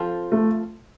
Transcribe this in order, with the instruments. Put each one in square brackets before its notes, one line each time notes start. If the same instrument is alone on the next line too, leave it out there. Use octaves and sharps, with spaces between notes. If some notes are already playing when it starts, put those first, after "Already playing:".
Already playing: [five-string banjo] F3 C4 F4 A4
[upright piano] A3